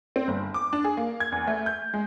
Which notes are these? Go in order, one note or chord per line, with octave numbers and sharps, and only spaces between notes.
C4
G1
D6
D4
G#4
A#3
G#6
E2
A3
G6
G#3